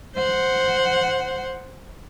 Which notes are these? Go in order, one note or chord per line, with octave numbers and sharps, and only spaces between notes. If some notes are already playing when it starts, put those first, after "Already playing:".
C5 F#5